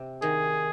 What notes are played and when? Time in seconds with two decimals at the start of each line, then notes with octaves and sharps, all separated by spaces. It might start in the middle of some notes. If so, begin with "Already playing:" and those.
Already playing: C3
0.22 D#3 G#4